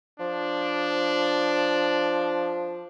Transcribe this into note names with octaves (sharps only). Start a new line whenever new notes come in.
F3 D4